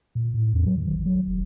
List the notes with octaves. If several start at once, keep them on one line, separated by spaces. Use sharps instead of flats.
A#2
A2
E2
F#3
D#3
A1
F#3
E1